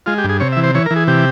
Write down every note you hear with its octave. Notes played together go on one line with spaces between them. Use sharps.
G#3 F4
G4
G2
G#4
C3 C#5
E5
E3
C5
E3 C#5
A#4
E3
G#4
C3 G4